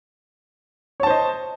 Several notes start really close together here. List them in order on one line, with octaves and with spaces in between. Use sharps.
C#5 A5 C5 D#5